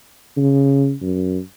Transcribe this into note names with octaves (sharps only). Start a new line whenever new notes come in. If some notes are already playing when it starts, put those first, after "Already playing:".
C#3
F#2